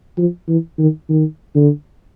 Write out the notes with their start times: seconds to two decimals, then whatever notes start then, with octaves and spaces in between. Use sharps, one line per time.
0.18 F3
0.48 E3
0.79 D#3
1.10 D#3
1.55 D3